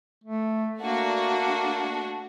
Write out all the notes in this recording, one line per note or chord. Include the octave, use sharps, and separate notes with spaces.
A3
A3 A#3 D4 F#4